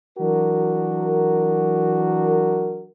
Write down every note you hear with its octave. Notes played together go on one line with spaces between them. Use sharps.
E3 F#3 D4 F#4 A#4